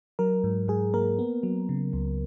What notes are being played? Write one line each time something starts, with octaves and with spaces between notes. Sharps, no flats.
F#3 A#4
G#2
G#2 G#4
A#3 A#4
B3
F#3
C#3
C#2